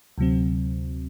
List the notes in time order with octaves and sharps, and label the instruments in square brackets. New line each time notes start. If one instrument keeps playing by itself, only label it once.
[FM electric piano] D2 C3 F#3 C4